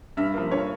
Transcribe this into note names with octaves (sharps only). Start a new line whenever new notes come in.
G2 E5
F3 A#3
G2 C#5